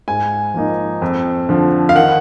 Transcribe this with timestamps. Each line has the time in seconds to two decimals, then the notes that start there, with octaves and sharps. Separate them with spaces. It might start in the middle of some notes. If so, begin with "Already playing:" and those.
0.08 G#2 G#5
0.54 F3 A#3 D#4
1.02 F2
1.49 D3 F3
1.89 F5
1.95 D#3 F#5